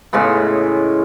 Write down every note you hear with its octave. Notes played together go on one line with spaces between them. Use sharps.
A2 C#3 G#3 B3